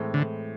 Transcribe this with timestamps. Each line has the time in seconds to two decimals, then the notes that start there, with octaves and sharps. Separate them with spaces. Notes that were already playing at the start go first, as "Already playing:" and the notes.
Already playing: A2 E3 G#3 C4
0.14 D3